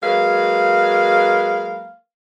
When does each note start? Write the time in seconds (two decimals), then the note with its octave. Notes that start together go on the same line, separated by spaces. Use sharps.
0.03 F#3 G#3 A#3 B4 F5